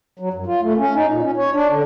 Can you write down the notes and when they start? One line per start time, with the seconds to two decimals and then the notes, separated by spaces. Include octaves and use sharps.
0.20 F#3
0.34 F#2
0.46 F4
0.61 A3
0.78 C#4
0.94 D#4
1.09 A#2
1.22 C#4
1.37 C#5
1.53 D4
1.70 D3